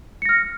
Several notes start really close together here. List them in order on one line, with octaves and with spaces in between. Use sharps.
C#7 A#6 F6